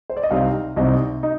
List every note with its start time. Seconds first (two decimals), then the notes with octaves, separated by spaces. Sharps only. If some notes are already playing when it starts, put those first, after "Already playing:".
0.10 C5
0.17 D5
0.23 D#5
0.31 C2 C3 G3 C4 D#4 F5
0.76 C2 C3 G3 C4 D#4 D#5
1.23 D#4 D#5